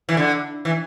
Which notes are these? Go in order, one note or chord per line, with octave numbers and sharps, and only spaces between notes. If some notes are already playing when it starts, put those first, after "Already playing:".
E3
D3
E3